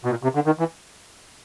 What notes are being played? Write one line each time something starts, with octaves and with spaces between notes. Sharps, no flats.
B2
A#2
C3
D3
D#3
E3